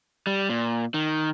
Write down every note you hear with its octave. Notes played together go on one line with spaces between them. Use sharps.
G3
A#2
D#3